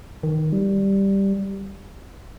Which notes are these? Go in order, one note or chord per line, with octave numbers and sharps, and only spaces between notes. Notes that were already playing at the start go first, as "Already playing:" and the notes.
D#3
G3